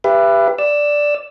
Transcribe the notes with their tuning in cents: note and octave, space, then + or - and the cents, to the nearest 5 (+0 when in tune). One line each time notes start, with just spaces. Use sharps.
G4 +20 B4 +0 E5 +35
D5 +0 E6 +10